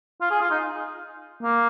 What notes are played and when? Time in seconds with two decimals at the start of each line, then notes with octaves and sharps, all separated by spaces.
0.21 F4
0.31 G#4
0.41 F4
0.51 D#4
1.43 A#3